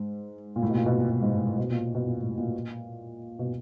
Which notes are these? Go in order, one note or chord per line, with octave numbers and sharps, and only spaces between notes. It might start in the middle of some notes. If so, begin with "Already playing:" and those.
Already playing: G#2
A#2
A2
B2
A#2
B2
A#2
B2
G#2
A2
A2
B2
A#2
B2
A#2
A2
A#2
B2